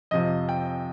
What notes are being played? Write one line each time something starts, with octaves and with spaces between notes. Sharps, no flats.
F2 C3 F3 D#5
G5